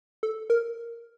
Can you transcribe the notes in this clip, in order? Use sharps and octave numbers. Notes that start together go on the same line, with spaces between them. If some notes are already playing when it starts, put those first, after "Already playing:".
A4
A#4